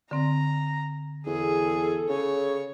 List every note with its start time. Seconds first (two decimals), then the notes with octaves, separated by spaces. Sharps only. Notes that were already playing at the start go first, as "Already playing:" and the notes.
0.11 D3 C4 A#5
1.27 E2 G#4 A4
2.09 C#3 C#5